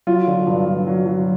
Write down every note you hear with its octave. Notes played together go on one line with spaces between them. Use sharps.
F#3 F4
D3
G2
G2
F#3
F#3